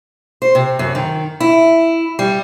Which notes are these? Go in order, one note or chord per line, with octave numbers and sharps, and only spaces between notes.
C5
C3
F#2
D#3
E4
G3